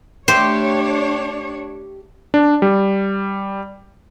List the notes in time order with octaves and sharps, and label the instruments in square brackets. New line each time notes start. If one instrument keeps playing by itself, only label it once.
[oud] A3 [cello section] D4 C#5 [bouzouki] G4 [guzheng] C5
[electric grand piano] D4
G3